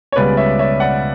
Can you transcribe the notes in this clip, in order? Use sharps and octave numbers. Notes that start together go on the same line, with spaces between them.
C#5
C#2 C#3 G3 B3 B4 D5
C#5 E5
C#5 E5
D5 F#5